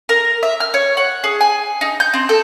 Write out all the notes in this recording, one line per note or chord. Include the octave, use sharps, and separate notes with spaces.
A#4
E5
F6
C#5
F#5
G#4
G#5
D#4
G6
C4
A4